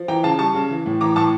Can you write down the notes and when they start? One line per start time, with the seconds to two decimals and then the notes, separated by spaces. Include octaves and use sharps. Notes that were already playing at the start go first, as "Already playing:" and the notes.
Already playing: F3
0.08 E3 G5 A#5
0.23 C#3 F5 A5
0.39 G3 A5 C#6
0.54 C#3
0.70 E3
0.86 A2
1.01 E3 A#5 D6
1.16 A2 A5 C#6